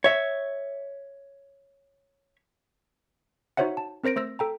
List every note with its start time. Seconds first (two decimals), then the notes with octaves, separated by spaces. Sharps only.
0.04 C#5 E5
3.57 D#4 F#4 C5 C#5 E5 F#5
3.77 A5
4.03 C4 A#4 C5 A#6 D7
4.16 A3 C5 E6 A#6
4.39 A4 G5 A#5